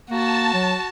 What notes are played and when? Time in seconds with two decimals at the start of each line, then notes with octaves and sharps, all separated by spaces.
0.10 A#3 F#4 A5
0.54 F#3